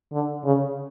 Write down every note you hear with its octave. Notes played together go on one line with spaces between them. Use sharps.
D3
C#3